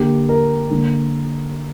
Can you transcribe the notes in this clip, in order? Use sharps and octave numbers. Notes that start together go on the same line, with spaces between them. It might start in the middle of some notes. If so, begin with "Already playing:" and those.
Already playing: D3 A#3 G4
A#4
D3 A#3